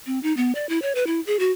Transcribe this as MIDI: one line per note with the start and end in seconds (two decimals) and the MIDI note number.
0.06 0.19 60
0.23 0.35 63
0.37 0.54 59
0.55 0.66 74
0.69 0.81 64
0.82 0.95 73
0.95 1.06 71
1.07 1.20 64
1.27 1.39 68
1.39 1.52 66